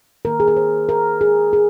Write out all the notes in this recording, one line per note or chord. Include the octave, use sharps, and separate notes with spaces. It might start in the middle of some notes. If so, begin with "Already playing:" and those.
D#3 A#3 A#4
G#4
A#4
C5
A#4
G#4
G#4